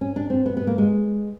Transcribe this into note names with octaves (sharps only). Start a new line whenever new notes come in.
C#4
D4
C4
B3
B3
A#3
G#3